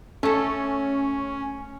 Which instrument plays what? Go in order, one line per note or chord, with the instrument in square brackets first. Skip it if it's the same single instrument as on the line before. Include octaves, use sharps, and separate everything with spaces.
[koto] A3 A4 [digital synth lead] C#4